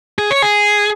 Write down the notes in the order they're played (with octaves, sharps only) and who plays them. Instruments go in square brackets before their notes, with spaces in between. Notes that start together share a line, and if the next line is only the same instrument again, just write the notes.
[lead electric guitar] G#4
C#5
G#4